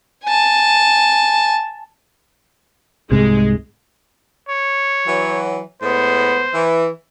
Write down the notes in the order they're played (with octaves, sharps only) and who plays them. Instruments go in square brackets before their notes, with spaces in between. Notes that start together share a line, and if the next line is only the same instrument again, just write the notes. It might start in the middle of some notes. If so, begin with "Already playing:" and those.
[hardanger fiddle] G#5 A5
[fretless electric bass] C2 G#2 C3 [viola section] G#3
[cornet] C#5
[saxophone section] E3 F#3
[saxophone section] A2 G#3 B3 [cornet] C5
[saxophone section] E3